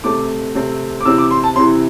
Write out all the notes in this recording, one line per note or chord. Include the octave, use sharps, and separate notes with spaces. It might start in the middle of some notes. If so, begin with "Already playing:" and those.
C3 A3 C4 D6
C3 A3 C4
D6
C3 E3 C4 E6
D6
C6
A5
C3 E3 C4 C6